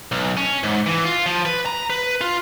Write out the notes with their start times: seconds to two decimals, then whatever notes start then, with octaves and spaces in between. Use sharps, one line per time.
0.12 B1
0.37 C#4
0.64 G#2
0.86 E3
1.05 F4
1.26 F3
1.46 B4
1.66 A#5
1.90 B4
2.21 F4